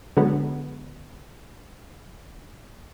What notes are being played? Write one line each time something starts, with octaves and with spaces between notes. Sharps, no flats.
D3 F#3 G#3 B3